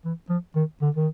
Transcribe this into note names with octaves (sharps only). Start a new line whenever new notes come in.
E3
F3
D#3
D3
D#3